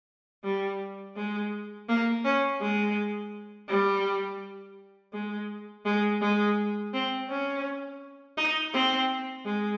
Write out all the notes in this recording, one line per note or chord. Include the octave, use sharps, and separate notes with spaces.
G3
G#3
A#3
C#4
G#3
G3
G#3
G#3
G#3
C4
C#4
D#4
C4
G#3